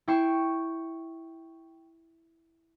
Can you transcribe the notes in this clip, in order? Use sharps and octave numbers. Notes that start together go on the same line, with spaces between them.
E4 G5 C#6 C7 E7